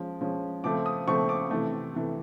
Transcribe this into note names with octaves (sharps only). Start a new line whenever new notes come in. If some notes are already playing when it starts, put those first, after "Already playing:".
Already playing: F3 G#3 C#4
F3 G#3 C#4
C#3 F3 A3 C4 D6
D#6
C#3 F3 A3 C4 C#6
D6
C3 E3 A3
C3 E3 A3